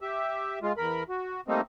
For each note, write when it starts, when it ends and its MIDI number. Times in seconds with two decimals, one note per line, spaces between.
0.01 0.59 67
0.01 0.59 76
0.62 0.73 56
0.62 0.73 65
0.77 1.03 40
0.77 1.03 70
0.77 1.03 83
1.09 1.41 66
1.48 1.61 55
1.48 1.61 57
1.48 1.61 58
1.48 1.61 60
1.48 1.61 63